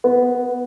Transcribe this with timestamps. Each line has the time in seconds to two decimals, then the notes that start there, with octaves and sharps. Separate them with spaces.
0.04 B3